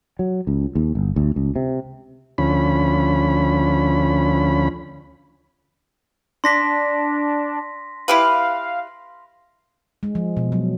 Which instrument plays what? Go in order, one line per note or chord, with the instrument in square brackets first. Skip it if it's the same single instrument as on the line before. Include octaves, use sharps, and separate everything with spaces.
[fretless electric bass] F#3
C#2
D#2
G1
D2
C#2
C3
[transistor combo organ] D2 F3 C#4 B5
[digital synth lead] D4 [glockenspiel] C6 A#6 B6
[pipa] E4 G4 B4 [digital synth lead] F5
[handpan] G#3
F3
B2
F#3